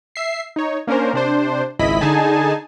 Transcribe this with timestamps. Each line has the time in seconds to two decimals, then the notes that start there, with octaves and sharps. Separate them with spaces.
0.16 E5 C7
0.56 D#4 C#5
0.87 A#3 C#4 D4 A#4 C5
1.13 C3 D4 C5
1.79 G#1 C#2 E4 D#5 B5 B6
2.01 D3 D#4 G#4 G#5 A5